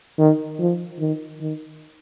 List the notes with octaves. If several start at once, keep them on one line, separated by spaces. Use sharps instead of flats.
D#3
F3
D#3
D#3